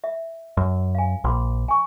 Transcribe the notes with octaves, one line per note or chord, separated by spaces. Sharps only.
E5
F#2
F5 G#5
A#1 B5 C6 D6
G#5 C#6